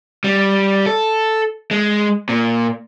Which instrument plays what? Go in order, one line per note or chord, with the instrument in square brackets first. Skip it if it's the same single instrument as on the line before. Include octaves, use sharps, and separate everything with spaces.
[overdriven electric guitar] G3
A4
G#3
A#2